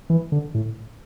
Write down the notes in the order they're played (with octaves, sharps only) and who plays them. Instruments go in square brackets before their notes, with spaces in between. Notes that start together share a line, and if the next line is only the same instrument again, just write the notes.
[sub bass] E3
D3
A2